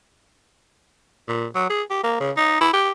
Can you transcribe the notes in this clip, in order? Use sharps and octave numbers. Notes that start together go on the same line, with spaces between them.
A#2
F#3
G#4
G4
A#3
C#3
D#4
E4
G4